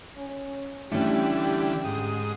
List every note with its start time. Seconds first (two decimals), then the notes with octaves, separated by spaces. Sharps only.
0.17 C#4
0.92 D3 E3 G3 A3 C#4 G4
1.85 G#2 D#6